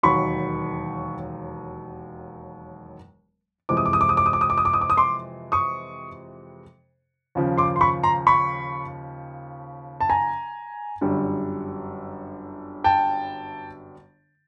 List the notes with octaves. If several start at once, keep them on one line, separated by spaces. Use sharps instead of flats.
E1 D#2 D#3 F#3 B5 C#6
F2 C3 E3 G#3 D6
D#6
D6
D#6
D6
D#6
D6
D#6
D6
D#6
D6
D#6
D6
D#6
D6
D#6
C6 D6
C#6 D#6
D#2 C#3 F3
C6 D6
C6
B5 C#6
A#5 C6
B5 C#6
A5
G#5 A#5
G1 F#2 D3 G3
G5 A5